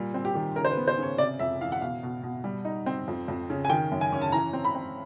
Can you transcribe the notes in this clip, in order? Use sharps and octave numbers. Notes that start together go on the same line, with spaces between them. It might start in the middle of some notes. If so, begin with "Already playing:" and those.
Already playing: A#2 G3
C4
G4
D#3
C#3 A#4
C5
B4
B3
C5
C#3 C#5
C3 D5
F2 E5
E3 F5
F#5
B2 F5
B2
B2
G3
D#4
C4
F2
F2
C#3
G#5
D#3 G5
F#2
G#5
C#4
A5
E3 A#5
C4
B5
C4